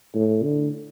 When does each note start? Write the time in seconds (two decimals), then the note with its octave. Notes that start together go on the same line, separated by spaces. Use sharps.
0.15 A2
0.43 D3